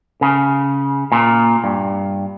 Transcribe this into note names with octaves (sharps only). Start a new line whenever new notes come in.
C#3
A#2
G2